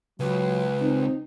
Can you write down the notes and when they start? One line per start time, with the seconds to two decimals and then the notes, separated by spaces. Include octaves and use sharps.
0.20 C#2 F#3 B4
0.81 C4 D#4